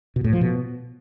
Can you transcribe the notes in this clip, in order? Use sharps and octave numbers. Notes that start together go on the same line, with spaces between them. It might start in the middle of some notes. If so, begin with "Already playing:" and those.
B2
A2
F3
B2